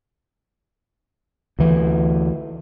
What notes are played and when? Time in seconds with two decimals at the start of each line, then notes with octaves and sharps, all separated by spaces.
1.59 D2 E3